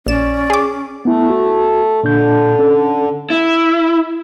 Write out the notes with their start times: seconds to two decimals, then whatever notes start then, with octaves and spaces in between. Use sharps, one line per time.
0.07 A#1 C#4 D5 E7
0.50 G#4 D6
1.05 A3 B3 E4
1.29 F#4
2.03 A#2 D3 D4 G6
2.59 C#4 A4
3.30 E4